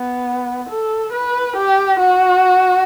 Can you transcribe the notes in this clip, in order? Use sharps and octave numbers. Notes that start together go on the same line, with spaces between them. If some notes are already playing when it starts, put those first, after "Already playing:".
Already playing: B3
A4
B4
G4
F#4